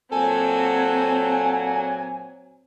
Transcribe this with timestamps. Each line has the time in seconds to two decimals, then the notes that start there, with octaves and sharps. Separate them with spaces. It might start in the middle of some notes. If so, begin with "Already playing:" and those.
0.12 A#2 F#3 C4 A4 G#5